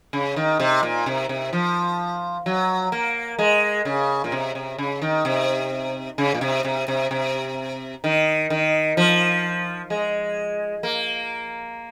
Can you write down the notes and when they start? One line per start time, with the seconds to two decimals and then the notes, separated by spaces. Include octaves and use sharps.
0.13 C#3
0.36 D#3
0.60 C3
0.83 A#2
1.06 C3
1.29 C3
1.53 F3
2.46 F#3
2.92 A#3
3.39 G#3
3.85 C#3
4.24 A#2
4.32 C3
4.55 C3
4.78 C#3
5.02 D#3
5.25 C3
6.18 C#3
6.34 A#2
6.41 C3
6.65 C3
6.88 C3
7.11 C3
8.04 D#3
8.50 D#3
8.97 F3
9.90 G#3
10.83 A#3